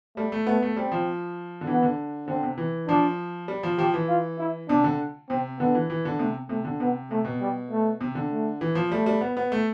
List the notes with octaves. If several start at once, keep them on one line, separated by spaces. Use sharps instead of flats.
G3 A3
A3
A3 B3
A3
G3 C4
F3
D3
E3 B3
D3
D3 C4
C3
E3
F3 D4
G3
F3
F3 G4
E3
F4
E4
C3 D4
D3
C3 C4
D3 B3
E3
E3
D3
C3 A3
C3 A3
D3
C3 B3
C3 A3
B2
G3
A3
C3
D3
A3
E3
F3
G3 A3
G3
B3
B3
A3